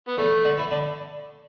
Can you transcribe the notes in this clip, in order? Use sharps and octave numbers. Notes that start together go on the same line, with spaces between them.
B3
E2 E3 A3
D3 D4
E3 E4
D3 D4